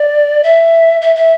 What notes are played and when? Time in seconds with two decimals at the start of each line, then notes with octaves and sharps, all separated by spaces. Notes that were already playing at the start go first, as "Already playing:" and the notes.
Already playing: D5
0.44 E5
1.02 E5
1.16 E5